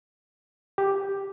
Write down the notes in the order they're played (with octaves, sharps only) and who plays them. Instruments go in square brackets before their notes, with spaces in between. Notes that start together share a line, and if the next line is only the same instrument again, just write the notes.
[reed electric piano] G4